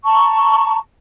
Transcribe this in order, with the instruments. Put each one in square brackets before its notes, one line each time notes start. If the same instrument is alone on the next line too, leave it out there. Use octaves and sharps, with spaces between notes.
[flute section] A5 A#5 C#6